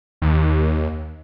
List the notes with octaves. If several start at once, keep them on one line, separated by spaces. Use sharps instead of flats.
D#2